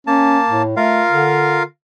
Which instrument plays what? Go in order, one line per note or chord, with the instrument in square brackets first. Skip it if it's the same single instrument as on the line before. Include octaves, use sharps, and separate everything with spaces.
[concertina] A#3 A5 [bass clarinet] C#4
[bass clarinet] A2
[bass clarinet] A3 [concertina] F4 A#4 F5
[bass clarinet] D3